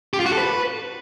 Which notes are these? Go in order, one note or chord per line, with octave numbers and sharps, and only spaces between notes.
G4
F4
F#4
A4
B4